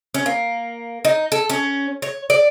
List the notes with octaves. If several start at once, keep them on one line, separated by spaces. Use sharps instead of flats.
C#4
A#3
D#4
A4
C#4
C#5
D5